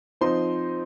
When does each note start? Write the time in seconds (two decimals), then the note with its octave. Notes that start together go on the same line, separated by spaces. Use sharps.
0.21 F3 C4 D#4 C5 C6